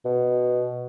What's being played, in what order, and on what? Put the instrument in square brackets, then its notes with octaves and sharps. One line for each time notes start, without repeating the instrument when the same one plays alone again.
[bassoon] B2